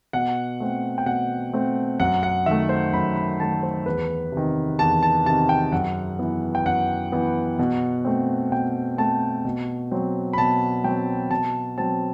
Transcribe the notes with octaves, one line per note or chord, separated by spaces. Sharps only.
B2 F#5
A3 C4
G5
B2 F#5
A3 C4
F#2 F#5
F#5
D#3 A3 E5
C5
F#2 B5
B5
D#3 A3 A5
C5
E2 B4
C3 D#3
E2 A5
A5
C3 D#3 A5
G5
F#2 F#5
E3 B3
G5
F#2 F#5
E3 B3
B2
A3 C4
B2 G5
A3 C4 A5
B2
F#3 C4
B5
B2 A5
F#3 C4 G5
B2 A5
F#3 C4 A5